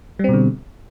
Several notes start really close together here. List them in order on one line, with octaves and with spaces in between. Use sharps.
G3 C4 B2 D3